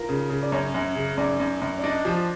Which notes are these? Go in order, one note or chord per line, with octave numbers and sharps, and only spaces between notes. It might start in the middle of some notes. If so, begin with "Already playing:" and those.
Already playing: F4 A#4
C#3
C#3
D5
F#2 C#5
F#2
C#3
F#2 D5
F#2
F#2
D5
D4 D#5
F3